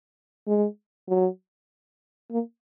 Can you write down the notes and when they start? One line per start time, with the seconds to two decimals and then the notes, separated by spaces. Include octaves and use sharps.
0.47 G#3
1.08 F#3
2.31 A#3